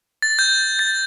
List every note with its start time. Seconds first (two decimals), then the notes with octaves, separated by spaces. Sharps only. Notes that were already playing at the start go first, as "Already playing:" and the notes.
0.22 A6
0.39 G6
0.79 A6